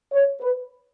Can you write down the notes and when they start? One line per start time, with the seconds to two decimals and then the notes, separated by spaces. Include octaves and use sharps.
0.12 C#5
0.41 B4